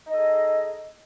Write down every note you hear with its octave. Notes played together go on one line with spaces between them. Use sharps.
D#4 G#4 A4 D#5